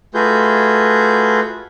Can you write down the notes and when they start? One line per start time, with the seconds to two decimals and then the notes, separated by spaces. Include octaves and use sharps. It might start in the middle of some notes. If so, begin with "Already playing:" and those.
0.14 A3 F4 F#4 G#4 B4 G6